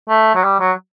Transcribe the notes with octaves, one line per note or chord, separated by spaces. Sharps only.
A3
F#3
G3
F#3